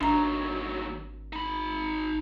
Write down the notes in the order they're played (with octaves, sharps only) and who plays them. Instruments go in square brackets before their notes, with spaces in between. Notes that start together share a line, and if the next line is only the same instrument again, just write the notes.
[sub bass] G#1 [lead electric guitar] D#2 F#3 [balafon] D4 A#5
[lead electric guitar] D#4 B5